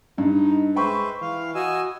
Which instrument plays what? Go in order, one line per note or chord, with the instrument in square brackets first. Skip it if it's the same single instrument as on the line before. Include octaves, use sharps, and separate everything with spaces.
[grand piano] G2 [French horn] D#4
[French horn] G#3 [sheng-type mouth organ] B4 C5 E5 [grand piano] G5 B5 C#6
[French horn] E3 [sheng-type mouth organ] F5
[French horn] F#4 [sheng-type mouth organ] D#5 G#5 E6